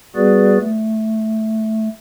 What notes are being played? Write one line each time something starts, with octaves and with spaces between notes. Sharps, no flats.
G3 B3 F#4 G#4 B4 D5
A3